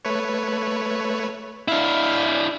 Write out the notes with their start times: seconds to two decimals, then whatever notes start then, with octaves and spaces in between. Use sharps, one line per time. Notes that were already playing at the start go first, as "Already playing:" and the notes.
0.05 A3 B4 C#5
1.68 D4 E4 E5 F5 F6